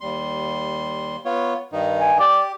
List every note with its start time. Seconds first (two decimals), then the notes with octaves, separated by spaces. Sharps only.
0.01 D#2 G3 C6
1.25 B3 F4 C#5
1.73 G2 D#3 D#4
2.00 G#5
2.19 G4 D5